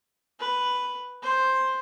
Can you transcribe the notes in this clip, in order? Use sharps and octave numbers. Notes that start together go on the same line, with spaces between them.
B4
C5